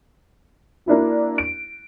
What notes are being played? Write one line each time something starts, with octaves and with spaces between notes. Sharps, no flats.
A#3 D4 E4 F#4
D7